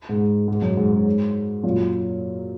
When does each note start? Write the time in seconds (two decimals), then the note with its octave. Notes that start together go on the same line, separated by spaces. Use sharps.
0.09 G#2
0.48 G#2
0.62 F#2
0.77 G#2
0.92 G#2
1.64 F#2 A#2